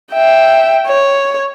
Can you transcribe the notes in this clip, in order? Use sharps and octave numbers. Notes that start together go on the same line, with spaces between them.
E5 G5
C#5